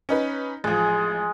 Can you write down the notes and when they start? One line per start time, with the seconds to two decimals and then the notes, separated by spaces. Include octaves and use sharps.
0.09 C#4 D#4 B4
0.64 A1 F3 G#3 G#4